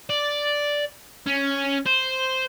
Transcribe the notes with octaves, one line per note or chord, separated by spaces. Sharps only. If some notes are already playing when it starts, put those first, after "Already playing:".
D5
C#4
C5